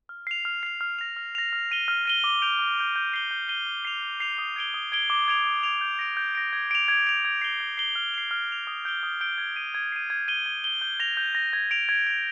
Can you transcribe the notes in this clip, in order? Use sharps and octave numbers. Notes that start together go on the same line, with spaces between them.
F6
C7 F7
F6
C7 F7
F6
A#6 F7
F6
A#6 F7
F6
A#6 D#7 G7
F6
A#6 D#7 G7
D6
G6 D7 F7
D6
G6 D7 F7
G6
C7 D#7 G7
G6
C7 D#7 G7
F6
C7 F7
F6
C7 F7
D#6
G#6 D7 G7
D#6
G#6 D7 G7
D6
G#6 D7 F7
D6
G#6 D7 F7
G6
A#6 D7
G6
A#6 D7
G#6
D7 F7
G#6
D7 F7
G#6
C7 G7
G#6
C7 G7
F6
C7 F7
F6
C7 F7
D#6
G6 D7 G7
D#6
G6 D7 G7
G#6
C7 D#7
G#6
C7 D#7
G#6
D#7 G7
G#6
D#7 G7
G6
A#6 F7
G6
A#6 F7
G#6
D7 F7
G#6
D7 F7